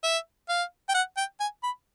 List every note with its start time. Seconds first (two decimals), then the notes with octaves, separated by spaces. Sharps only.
0.04 E5
0.49 F5
0.89 G5
0.94 F#5
1.17 G5
1.40 G#5
1.63 B5